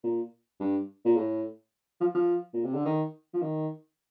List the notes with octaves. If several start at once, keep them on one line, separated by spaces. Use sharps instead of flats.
A#2
G2
A#2
A2
F3
F3
A#2
C3
D3
D#3
F3
D#3